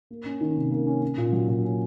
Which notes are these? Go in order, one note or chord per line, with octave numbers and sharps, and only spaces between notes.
A#3
C#4
D#3
C3
A#3
C#4
C#4
A#2
F#3
A#2
C#4